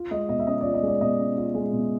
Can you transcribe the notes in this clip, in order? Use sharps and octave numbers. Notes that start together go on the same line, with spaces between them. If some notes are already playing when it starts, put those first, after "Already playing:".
Already playing: F4
G#3 D#5
B2 D#5
E5
C#4 D#5
D5
F4
D#5
G#3 D5
B2 D#5
C#4
F4
G#3
B2